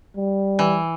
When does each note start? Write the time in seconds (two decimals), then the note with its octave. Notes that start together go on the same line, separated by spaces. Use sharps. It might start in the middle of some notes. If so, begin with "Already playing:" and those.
0.17 G3
0.59 E3